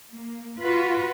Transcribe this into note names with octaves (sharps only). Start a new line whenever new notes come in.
A#3
F4 F#4 B4